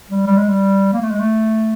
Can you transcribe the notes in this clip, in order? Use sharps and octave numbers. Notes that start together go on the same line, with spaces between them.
G3
G3
G#3
G3
A#3
A3
G#3
A3